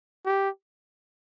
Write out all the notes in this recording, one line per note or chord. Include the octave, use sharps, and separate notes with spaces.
G4